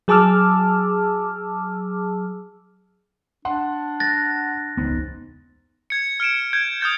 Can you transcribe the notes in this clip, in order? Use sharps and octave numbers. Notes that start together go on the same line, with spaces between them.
F#3 G#4 A5 D6 E6 F6
D4 F#5 C6
F#6 A6 A#6
E1 C#2 G#2 B3
G#6 C#7
F6 C#7 D7 E7
G6 G#6
D#6 F6 G6 A6